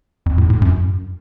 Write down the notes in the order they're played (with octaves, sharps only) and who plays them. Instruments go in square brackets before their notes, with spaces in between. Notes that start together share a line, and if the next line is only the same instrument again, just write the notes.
[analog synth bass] F2
A2
A2
F#2